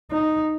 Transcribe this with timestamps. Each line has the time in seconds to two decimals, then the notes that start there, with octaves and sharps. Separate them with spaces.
0.11 D#4